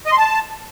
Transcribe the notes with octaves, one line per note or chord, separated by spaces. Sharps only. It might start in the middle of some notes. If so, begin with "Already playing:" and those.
D#5
C6
A5